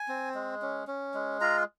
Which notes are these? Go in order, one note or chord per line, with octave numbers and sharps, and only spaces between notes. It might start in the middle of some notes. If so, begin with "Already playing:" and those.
Already playing: G#5
C4
G#3
C#4
C#4
G#3
F4 A#5